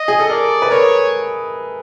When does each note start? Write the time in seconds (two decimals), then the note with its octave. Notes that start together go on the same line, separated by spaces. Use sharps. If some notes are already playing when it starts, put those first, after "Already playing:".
Already playing: D#5
0.08 G#4
0.20 A4
0.30 A#4 D5
0.62 B4
0.71 A#4 C#5